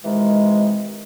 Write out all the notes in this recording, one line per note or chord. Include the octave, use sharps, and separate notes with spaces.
C3 D#3 E3 G#3